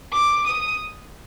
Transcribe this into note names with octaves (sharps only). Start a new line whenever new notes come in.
D6
D#6